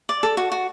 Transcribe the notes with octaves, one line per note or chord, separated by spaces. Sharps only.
D5
A4
F#4
F#4